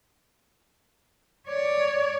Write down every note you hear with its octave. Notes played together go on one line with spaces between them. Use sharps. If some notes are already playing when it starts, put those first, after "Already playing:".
C#5 D5